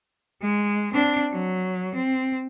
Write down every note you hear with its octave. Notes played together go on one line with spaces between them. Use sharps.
G#3
C4 D4
F#3
C4